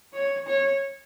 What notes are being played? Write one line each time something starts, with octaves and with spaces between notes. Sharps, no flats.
C#5
C#5